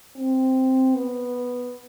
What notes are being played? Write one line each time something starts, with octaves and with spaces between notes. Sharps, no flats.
C4
B3